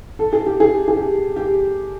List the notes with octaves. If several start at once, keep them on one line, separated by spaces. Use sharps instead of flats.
A4
G#4
G4
G#4
G#4
G4
G4